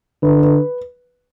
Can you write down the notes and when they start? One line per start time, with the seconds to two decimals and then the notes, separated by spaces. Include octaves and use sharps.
0.23 D3 B4
0.43 B4